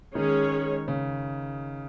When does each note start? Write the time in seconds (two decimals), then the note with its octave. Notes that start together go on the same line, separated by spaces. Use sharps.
0.15 D#3 G#3 C#4 G#4 C#5
0.88 C#3